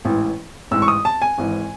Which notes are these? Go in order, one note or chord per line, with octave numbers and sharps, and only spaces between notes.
A1 G#2 E3
A1 G#2 E3 E6
C#6
D#6
A5
G#5
G#1 G#2 E3